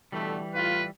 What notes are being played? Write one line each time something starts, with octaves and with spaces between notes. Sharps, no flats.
B2 D3 E3 G3 A3
A2 F4 B4